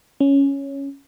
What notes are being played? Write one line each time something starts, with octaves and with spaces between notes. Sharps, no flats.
C#4